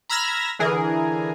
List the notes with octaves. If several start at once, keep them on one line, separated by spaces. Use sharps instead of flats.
A#5 B5 E6 F6 G#6 A#6
D3 E3 G#4 A#4